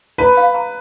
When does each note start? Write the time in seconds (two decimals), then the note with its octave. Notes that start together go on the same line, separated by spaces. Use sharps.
0.18 B4 A#5
0.37 F5
0.54 A#5